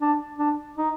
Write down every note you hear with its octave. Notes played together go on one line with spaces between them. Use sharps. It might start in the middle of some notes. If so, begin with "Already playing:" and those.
D4
D4
D#4